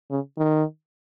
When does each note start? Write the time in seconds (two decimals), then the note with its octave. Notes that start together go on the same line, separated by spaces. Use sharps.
0.11 C#3
0.38 D#3